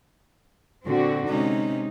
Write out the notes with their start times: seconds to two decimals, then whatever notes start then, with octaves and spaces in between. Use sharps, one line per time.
0.86 A#2 D3 C4 F#4
1.28 C3 G#3 C#4 D#4